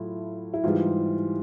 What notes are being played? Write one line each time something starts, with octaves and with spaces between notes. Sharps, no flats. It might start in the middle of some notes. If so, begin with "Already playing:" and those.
Already playing: A2 F#3 A3 E4 F4
E4
G#2 E3 G3 F4